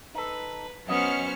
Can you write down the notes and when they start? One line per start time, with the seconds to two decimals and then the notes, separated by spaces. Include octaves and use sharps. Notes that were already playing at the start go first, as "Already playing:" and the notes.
0.14 D#4 A4 B4
0.88 F#3 B3 C#4 C5 D#5 F6 C#7